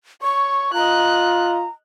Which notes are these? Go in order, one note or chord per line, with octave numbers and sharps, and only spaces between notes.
C#5 C#6
F4 D#5 A#5 F#6